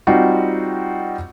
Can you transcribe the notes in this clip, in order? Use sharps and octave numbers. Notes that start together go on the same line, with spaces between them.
G3 C4 D#4 F4 F#4